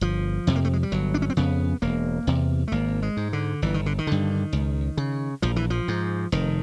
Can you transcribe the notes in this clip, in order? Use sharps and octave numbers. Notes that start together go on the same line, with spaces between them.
G1 F3
F2 C3
A#3
A3
G#3
G3
G1 F#3
D4
C#4
C4
F2 C#3 B3
E1 A#3
E2 C3
A3
G#1 A#3
G#3
G#2
D3
G1 E3
D#3
D3
D#3
G2 D3
C#2
C#3
A#1 F3
E3
F3
G#2
F1 D#3